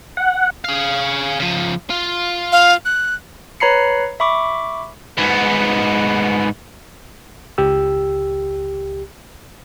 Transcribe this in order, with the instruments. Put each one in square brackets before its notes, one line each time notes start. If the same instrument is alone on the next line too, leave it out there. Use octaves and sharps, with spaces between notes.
[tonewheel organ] F#5
[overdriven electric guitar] G#4 F5
C#3 F3
F4
[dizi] F5
F#6
[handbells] B4 C#5 A#5 B5 C7 C#7
E5 B5 C#6 D6
[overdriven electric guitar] G#2 B3
[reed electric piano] C#2 G4 E6